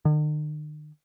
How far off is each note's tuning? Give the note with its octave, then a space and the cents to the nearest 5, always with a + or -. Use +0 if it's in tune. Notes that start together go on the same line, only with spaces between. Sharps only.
D#3 -45